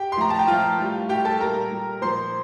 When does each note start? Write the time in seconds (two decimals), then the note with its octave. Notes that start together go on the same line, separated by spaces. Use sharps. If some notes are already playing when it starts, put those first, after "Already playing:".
Already playing: G4 G5
0.12 C6
0.17 A2 F3 A#5
0.30 A5
0.39 G5
0.47 A2 F3 F4 F5
0.78 A2 G3
1.09 A2 G3 G4 G5
1.25 A4 A5
1.40 A#2 G3 A#4 A#5
1.72 A#2 G3
2.02 A#2 F3 C5 C6